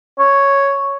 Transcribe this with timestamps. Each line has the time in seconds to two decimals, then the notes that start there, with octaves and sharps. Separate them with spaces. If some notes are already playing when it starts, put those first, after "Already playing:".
0.19 C#5